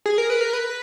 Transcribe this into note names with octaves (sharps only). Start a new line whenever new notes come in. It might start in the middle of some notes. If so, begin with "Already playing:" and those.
G#4
A#4
B4
A#4
B4